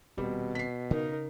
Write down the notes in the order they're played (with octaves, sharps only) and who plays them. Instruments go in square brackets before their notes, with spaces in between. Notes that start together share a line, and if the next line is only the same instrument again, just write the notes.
[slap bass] D#1 C4 [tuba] B2 [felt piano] G3
[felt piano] B6 C7
[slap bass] C#3 [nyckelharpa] D#4 A#4